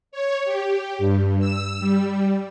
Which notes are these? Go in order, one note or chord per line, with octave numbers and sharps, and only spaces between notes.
C#5
G4
G2
E6
G3